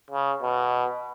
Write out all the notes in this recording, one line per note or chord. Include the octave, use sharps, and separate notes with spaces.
C#3
B2